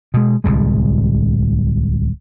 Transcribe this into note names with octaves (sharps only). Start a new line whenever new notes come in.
B2 G#3
D1 C2 A2 G#3